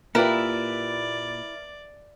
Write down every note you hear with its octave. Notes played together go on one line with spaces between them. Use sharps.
A#2 E4 F4 G4 A#4 B4 D5